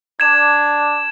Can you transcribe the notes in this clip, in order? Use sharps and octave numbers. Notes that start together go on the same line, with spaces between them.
D4 G#6 E7